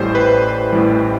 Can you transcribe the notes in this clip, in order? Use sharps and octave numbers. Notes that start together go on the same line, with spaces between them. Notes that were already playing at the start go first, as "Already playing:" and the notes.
Already playing: A1 A2 E3 G3 C5
B4
A1 A2 E3 G3